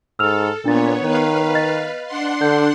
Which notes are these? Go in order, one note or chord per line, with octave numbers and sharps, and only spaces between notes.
G#2 A4 E6 F6 F7
A#2 B3 D4 C#5 A6
D#3 B4 C#5 F5
D#5 A6
D4 F#5 C6
D3 G6